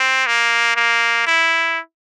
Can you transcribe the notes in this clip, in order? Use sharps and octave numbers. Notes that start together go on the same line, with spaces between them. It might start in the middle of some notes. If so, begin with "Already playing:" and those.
Already playing: C4
A#3
A#3
E4